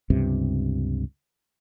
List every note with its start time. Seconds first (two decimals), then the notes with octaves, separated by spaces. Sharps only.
0.10 C#2 G2 C3